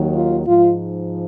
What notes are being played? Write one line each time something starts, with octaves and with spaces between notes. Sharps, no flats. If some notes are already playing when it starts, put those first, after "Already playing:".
Already playing: D#2 D#3 F#3
F4
G#2 F3 F4